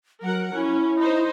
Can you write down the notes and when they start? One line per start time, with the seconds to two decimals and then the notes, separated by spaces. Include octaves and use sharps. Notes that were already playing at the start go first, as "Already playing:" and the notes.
0.22 F#3 A#4 F#5
0.55 C#4 E4
0.99 D#4 C5